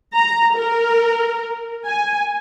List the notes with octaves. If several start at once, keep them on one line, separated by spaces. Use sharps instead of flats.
A#5
A#4
G#5